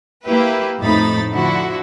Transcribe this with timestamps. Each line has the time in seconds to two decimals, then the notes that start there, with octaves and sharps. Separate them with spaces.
0.24 A#3 E4 G4 B4
0.81 F2 A2 A3 D#4 B5 A6
1.32 D3 F3 E4 F#4